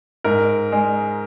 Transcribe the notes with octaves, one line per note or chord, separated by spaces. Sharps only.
G#2 A#4
G#3